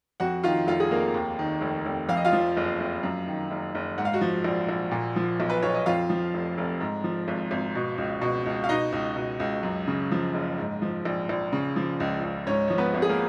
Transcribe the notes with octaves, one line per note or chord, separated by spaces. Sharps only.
F2 F#4 F#5
D#3 F4 F5
F1 F4 F5
G#4
F1 A#3 A#4
D#2
D#3
F1
F1
F2 F5
D#5
F4 F5
F3
F#1
F#1
F#2
D#3
F#1
F#1
G#2 F#5
F5
F#4 F#5
F3
A#1
A#1
A#2
F3
B1
B4
B1 C#5
D#5
F2 F4 F5
F3
F1
F1
G#2
F3
G#1
G#1
B2
C#2
B2
C#2
F5
B2 D#4 D#5
C#2
B2
C#2
F#2
C#3
F3
F#1
G#2
F3
A#1
A#1
C#3
F3
C#2
C#2
G#2 C#4 C#5
F3 C#5
B3 B4
G#1
G#4
A#3 A#4